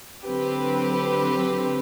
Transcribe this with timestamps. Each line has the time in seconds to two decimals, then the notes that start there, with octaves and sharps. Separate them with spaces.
0.24 D3 F#3 C4 G4 B4